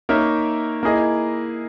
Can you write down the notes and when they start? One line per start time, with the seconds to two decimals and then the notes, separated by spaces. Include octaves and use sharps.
0.09 A#3 D#4 A#4 C#5 E5
0.83 A#3 E4 G#4 D#5